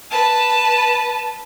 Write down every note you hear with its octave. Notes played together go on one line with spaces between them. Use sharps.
B4 A5